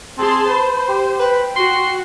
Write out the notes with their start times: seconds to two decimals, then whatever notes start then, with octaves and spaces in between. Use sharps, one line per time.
0.18 C4 G#4 A5 C6
0.49 B4 C5
0.89 G4
1.20 B4 G5
1.56 F#4 C6